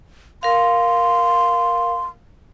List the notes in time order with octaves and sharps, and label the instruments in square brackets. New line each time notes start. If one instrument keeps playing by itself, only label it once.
[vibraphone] A#4 F5 [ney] C6